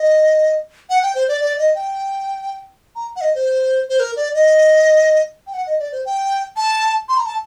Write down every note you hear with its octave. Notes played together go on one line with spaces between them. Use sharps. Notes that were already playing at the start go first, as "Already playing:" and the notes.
Already playing: D#5
F#5
G5
C5
D5
D5
D#5
G5
A#5
F#5
D#5
C5
C5
A#4
D5
D#5
G5
F#5
D#5
D5
C5
G5
A5
C6
A#5
A5